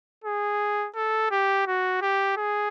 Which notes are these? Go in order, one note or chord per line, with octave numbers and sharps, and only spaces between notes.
G#4
A4
G4
F#4
G4
G#4